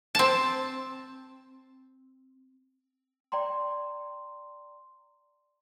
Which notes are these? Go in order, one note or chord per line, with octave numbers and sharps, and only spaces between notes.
C4 A5
D5 G5 A#5 C6